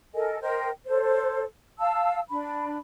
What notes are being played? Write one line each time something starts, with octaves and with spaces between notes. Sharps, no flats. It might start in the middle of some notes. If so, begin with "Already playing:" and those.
A4 A#4 D#5 G#5
A#4 C5 D#5 G5
A4 C5 C#5
F5 A5 E6
D4 B5